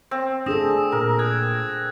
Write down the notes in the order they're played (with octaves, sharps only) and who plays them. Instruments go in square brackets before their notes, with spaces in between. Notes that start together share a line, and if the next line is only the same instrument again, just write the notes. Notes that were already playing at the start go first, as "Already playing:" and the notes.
[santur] C4
[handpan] D4 G#4 A4 [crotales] D#6 A#6 E7
[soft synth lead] A#2 [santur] A#4
[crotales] D#6 F#6 G#6